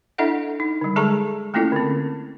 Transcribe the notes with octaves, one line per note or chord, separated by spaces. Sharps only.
D4 E4 A4 D#5 E5 F#5
D#4
D3 G3
G#3 G#4 A4 A5 A#5 C#6
A3 A#3 C#4 E4 F4 A4
D3 C4